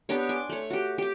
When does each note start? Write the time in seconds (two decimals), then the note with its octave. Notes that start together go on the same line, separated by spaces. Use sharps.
0.09 B3 D4 G4 C#5
0.29 G#5 C6 D6
0.49 A3 C#5
0.70 F#4 G4
0.98 G4 D6